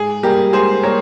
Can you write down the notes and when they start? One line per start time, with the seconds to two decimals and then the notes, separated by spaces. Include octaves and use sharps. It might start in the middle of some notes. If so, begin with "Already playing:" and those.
Already playing: G#2 G#4
0.23 G3 A#3 G4 A#4
0.53 G#2 G#4 C5
0.83 G3 A#3 A#4 C#5